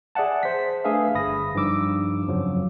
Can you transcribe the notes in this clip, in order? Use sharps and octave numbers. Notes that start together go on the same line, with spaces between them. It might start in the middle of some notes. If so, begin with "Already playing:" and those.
G#4 D5 E5 F#5 A5
C5 B6
A3 D4 G#4 B4 E5 F5
G1 B5 D#6 A#6
G2 F3 D#4 D6 E6
F2 C#3 F3 F#3